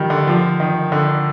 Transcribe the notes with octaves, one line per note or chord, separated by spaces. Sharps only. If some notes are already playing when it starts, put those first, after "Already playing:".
Already playing: D#3 F3 G3
D3
F3
D#3
D3